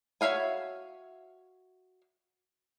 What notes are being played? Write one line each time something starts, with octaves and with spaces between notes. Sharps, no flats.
F#4 C#5 E5 F5 G#5